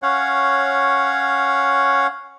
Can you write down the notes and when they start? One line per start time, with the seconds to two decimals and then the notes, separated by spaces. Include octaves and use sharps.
0.03 C#4 C#5 F5 F#5